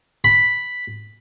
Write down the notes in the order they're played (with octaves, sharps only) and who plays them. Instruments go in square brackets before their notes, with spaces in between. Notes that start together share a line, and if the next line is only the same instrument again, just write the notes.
[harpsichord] B5